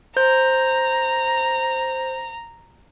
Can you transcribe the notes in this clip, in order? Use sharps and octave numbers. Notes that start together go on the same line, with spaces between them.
C5 A#5 G6